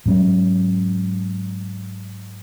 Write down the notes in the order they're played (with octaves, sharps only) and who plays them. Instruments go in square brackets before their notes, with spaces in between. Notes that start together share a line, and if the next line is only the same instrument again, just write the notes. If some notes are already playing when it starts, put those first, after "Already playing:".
[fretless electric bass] G#2 F#3 C#4